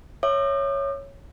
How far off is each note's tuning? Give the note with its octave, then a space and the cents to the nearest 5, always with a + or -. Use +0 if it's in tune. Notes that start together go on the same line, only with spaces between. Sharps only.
C#5 +0 E5 +0 D6 +45